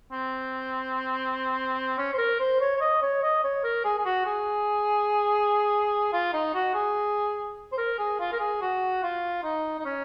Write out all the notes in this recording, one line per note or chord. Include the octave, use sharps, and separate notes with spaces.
C4
C#4
C5
A#4
C5
C#5
C#5
D#5
C#5
D#5
C#5
A#4
G#4
G#4
F#4
G#4
F4
D#4
F#4
G#4
C5
A#4
G#4
F4
A#4
G#4
F#4
F4
D#4
D#4
C#4